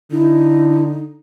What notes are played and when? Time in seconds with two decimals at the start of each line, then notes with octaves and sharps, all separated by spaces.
0.11 D3 D#4 E4